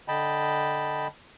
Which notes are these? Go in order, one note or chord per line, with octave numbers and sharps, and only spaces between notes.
D3 D#5 G5 A5 B5